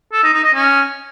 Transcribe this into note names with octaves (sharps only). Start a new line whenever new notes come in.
A4
D#4
D#4
D#5
C#4